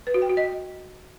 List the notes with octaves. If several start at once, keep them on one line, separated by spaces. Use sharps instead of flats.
B4
F#4
G5
F#4
D#5